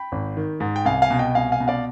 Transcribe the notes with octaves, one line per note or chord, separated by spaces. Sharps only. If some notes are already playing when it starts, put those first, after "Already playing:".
Already playing: G5 B5
G#1
D#3
G#2
G5
C2 F5 G#5
F5 G#5
B2
D#5 G5
C2 F5 G#5
F5 G#5
B2
D5 F5